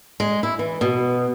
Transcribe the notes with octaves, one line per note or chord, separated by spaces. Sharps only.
G#3
E4
E3
B2